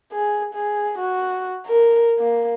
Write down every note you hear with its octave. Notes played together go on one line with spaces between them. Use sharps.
G#4
G#4
F#4
A#4
A#3